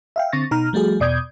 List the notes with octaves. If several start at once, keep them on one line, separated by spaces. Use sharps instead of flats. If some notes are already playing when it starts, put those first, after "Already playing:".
E5 F5 G5
D3 C4 C#6 A6 A#6
B2 D#4 A#5 F6
F3 G3 A3 F#4 G#4
E2 B2 D5 D#6 G6 G#6